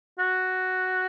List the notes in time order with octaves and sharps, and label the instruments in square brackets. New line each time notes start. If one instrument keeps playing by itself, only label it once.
[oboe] F#4